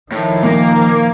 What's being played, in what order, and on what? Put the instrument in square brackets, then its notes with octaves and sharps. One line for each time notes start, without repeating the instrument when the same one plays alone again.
[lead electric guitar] A2 [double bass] D#3 F3
[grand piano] A#2 [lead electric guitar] A#3